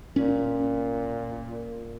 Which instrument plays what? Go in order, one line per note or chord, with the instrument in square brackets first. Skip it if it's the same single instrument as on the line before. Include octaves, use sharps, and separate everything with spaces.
[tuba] A#2 [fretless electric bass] C#4